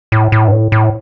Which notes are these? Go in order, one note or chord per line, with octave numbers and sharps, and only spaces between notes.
A2
A2
G2
A2
A2